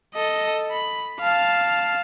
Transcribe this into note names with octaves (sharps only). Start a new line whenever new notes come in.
A4 D#5
B5
F5 A5